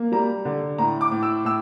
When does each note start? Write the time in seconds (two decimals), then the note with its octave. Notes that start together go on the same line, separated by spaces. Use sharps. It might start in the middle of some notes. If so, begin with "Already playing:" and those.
Already playing: A#3
0.12 G3 A#5
0.45 D3
0.78 A2 A#5
1.01 D6
1.11 A2
1.23 E6
1.45 A2 E6